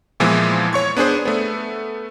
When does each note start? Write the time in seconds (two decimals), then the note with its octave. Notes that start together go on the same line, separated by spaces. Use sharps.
0.20 A#2 E3 F3 G#3 B3
0.73 C#5 C#6 G#6
0.97 B3 D4 G#4 C5
1.25 A3 B3